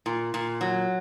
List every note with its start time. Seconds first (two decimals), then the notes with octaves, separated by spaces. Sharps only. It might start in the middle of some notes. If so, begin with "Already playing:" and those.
0.06 A#2
0.34 A#2
0.61 F#3